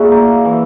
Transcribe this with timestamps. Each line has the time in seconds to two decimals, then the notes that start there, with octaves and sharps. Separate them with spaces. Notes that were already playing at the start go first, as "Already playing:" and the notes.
Already playing: A#2 E4 F#4 G#4
0.11 A#3
0.45 E3